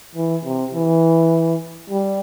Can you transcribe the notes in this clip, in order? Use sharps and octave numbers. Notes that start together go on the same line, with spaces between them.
E3
C3
E3
G3